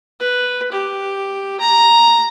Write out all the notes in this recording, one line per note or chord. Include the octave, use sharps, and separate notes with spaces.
B4
G4
A#5